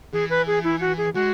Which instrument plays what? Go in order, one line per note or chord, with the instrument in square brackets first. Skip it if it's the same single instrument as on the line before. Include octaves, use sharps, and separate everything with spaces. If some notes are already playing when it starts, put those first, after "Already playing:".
[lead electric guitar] E3 [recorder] G#4
[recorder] B4
G#4
E4
F#4
G#4
[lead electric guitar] G#3 [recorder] F#4